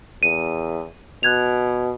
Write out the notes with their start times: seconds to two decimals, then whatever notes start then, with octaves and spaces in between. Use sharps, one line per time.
0.23 E2 D#7
1.23 B2 F#6 G#6 F7